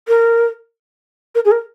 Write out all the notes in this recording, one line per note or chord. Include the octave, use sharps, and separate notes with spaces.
A#4
A#4
G#4
A#4